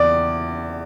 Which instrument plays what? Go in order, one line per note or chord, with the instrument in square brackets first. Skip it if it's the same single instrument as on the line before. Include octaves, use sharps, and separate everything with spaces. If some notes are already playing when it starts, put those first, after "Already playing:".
Already playing: [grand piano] E2 D5